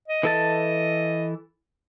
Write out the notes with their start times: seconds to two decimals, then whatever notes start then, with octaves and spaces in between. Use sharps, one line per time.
0.08 D#5
0.23 E3 A4 A5